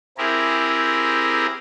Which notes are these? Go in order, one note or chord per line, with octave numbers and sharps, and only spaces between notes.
C4 E4 G4 G#4 A#4